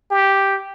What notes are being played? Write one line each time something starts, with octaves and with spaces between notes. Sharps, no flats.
G4